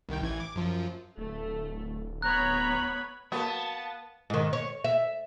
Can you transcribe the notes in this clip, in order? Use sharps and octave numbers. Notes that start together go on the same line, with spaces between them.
C2 D#3 G5
A1 E3 G#6
D6
F#2 F3
D1 A3
B3 C#5 A#5 B5 F#6
F#3 A#3 B3 B4 A5
G#2 D#3
C#5
E5